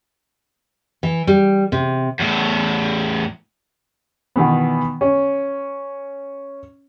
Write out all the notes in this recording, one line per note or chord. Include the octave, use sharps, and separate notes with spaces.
E3
G3
C3
E2 A2
B2 D#3 E3 B3
C#4